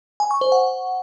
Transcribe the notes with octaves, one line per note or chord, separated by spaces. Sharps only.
G#5
C#6
C5
F#5